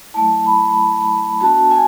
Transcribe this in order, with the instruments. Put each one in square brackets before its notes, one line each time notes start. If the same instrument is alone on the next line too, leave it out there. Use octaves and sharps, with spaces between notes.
[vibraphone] F#3 A3 E4 A5
B5
B3 D4 F#4 A5
G#5